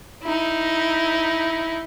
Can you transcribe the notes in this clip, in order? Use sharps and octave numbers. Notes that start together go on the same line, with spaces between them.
D#4 E4